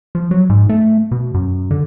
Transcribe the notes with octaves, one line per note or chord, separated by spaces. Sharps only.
F3
F#3
G#2
A3
B2
F#2
D3